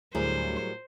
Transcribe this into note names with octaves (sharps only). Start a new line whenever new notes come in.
D2 A2 F#3 G3 E4 G#4 A#4 C5